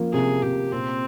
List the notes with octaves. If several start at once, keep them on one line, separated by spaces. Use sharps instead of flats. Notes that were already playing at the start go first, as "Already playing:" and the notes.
Already playing: F3 A#3
C3 G#4
C3 G4
A#2 C4